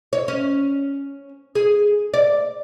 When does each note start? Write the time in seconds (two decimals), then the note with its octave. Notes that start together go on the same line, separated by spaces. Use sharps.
0.13 C#5
0.28 C#4
1.55 G#4
2.14 D5